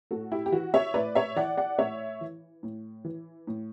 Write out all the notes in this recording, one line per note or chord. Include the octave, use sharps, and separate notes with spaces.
A2 F#4 A4
E4 G4
G4
E3 F#4
C#5 E5
A2 B4 D5
C#5 E5
E3 D5 F#5
D5 F#5
A2 C#5 E5
E3
A2
E3
A2